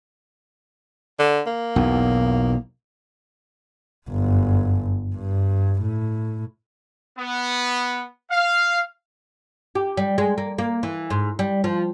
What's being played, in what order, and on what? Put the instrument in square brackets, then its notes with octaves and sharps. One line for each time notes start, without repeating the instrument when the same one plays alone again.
[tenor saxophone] D3
A#3
[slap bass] B1 E2
[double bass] G1 F#2
G2
A2
[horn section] B3
F5
[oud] G4
G3
G#3
A#3
A#3
E3
G#2
G3
F3